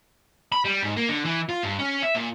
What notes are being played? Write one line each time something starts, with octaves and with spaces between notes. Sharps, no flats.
B5
G3
G#2
A#3
D3
E3
F4
G2
C#4
E5
A#2